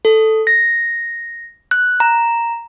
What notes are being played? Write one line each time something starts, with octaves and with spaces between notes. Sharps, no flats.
A4
A#6
F#6
A#5